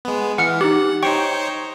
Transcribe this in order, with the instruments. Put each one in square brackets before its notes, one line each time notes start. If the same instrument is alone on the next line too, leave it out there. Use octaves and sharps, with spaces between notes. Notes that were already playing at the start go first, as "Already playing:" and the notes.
[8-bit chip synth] G#3 B3
[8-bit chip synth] E3 [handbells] F#5 F6 C#7
[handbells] D#4 G4 [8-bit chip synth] F#5
[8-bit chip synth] D#4 C5 C#5 [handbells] G5 C#6